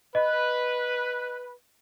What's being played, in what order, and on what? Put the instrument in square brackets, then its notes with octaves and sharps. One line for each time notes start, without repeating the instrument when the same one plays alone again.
[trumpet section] B4 [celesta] D#5